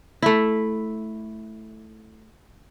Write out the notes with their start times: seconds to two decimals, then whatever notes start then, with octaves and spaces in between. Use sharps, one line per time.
0.22 A3 E4